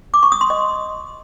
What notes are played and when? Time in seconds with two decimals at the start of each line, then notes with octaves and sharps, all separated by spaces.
0.14 D6
0.23 C#6
0.32 D#6
0.41 C6
0.50 D#5